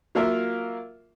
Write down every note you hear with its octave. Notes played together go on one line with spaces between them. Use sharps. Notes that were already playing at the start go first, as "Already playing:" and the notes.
F#3 A#3 F4 A#4 E5